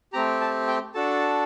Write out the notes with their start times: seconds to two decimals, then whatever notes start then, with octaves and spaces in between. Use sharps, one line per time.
0.13 A3 C4 G4 A#5
0.41 A5
0.68 G5
0.95 D4 F#4 A4 A5